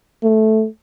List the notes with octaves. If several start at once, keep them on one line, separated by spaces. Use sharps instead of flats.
A3